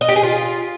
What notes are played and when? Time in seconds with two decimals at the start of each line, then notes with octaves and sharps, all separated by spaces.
0.01 D#5
0.08 G4
0.16 G#4
0.23 F4